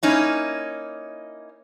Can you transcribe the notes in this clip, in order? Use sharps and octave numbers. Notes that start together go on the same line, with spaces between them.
A#3 C#4 D#4 E4